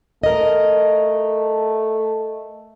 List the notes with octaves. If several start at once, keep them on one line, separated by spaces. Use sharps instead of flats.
A3 A#4 D#5